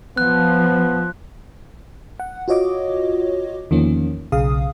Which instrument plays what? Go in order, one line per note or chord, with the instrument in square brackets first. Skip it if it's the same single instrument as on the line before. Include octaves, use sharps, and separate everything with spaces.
[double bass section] F3 [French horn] B3 [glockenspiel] F#6
[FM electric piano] F#5
F4 F#4 C#5 D#5 D6
E2 D#3 F3 A#3 C#4
B1 C#3 G#4 F5 D#6